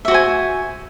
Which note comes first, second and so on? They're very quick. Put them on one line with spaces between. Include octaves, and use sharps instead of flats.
E5 F#4 C5 G#5